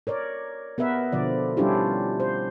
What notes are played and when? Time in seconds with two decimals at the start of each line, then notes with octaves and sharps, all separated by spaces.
0.07 A#4 C#5 D5
0.78 B3 A#4 B4 E5
1.12 B2 D3 F3 D5
1.57 G3 C#4 D4 E4 F4 G4
2.20 C5